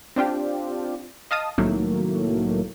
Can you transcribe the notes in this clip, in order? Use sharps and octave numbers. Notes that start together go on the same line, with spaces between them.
C4 D4 F4 G4
D#5 F5 A5 D#6
C2 A2 D#3 F#3 A3 A#3